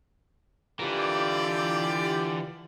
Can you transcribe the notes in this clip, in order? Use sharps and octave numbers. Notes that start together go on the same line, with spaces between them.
D3 E3 F4 G4 A#4 D5